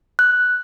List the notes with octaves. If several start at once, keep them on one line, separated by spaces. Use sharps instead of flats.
F#6